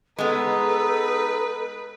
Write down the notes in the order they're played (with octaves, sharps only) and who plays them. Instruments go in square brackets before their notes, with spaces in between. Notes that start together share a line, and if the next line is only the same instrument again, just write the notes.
[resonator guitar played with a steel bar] G#3 B3 [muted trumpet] D#4 [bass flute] A4 [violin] B4